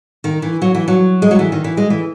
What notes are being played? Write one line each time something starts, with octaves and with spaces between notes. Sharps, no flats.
D#3
E3
F#3
E3
F#3
G#3
F#3
E3
D#3
E3
G#3
E3